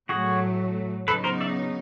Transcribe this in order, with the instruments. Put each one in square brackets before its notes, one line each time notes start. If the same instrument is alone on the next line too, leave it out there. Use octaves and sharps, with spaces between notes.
[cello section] A2 F#3 A3 [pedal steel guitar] F#4 G#4
[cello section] C#3 F#3 B3 D#4 [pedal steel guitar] A4 B4
[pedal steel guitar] A#4 C5
D5 E5